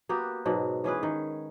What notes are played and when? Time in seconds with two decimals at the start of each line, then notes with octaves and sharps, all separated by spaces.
0.09 A#3 B3 F#4 G4
0.45 G#2 B2 F#3
0.84 E3 C#4 G#4 B4
1.03 D#3